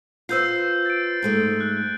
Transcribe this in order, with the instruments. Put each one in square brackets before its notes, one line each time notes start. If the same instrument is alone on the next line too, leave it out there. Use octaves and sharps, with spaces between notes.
[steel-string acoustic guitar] F4 B4 C5 [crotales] E6 G6 C7
[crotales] A6 D7
[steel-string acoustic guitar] G#2 G#3 A3
[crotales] F#6